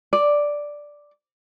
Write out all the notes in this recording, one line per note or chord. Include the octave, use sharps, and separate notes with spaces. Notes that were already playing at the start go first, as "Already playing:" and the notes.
D5